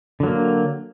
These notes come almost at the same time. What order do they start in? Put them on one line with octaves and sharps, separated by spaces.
D3 F#3 A#3